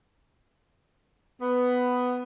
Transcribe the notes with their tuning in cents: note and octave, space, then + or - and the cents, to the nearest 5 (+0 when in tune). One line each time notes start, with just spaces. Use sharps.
B3 +10